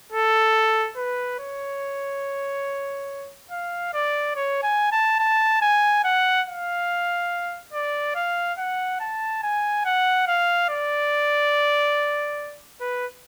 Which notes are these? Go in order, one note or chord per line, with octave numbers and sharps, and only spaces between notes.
A4
B4
C#5
F5
D5
C#5
G#5
A5
A5
G#5
F#5
F5
D5
F5
F#5
A5
G#5
F#5
F5
D5
B4